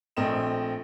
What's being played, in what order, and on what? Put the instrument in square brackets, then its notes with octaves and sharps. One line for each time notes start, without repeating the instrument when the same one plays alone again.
[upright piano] A#1 A3 C4 D#5 E7